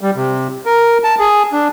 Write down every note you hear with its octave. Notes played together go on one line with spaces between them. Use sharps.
G3
C3
A#4
A5
G#4
D4